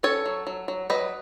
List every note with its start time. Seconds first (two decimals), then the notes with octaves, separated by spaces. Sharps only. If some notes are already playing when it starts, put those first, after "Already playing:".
0.03 C#4 A4 C#5
0.26 F#3
0.47 F#3
0.68 F#3
0.90 F#3 B4 D#5